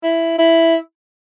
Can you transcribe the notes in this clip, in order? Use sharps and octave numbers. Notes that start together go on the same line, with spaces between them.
E4
E4